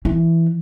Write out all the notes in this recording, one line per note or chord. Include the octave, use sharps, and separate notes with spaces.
E3